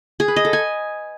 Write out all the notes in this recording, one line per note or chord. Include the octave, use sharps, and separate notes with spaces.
G#4
B4
D#5
A4
G#5